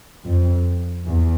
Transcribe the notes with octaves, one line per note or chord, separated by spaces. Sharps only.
F2
E2